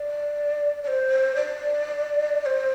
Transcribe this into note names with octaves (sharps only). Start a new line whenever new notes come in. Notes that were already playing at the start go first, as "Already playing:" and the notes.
Already playing: D5
D5
C5
D5
D5
C5